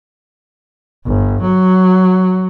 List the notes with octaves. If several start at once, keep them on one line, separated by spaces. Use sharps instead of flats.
G1
F#3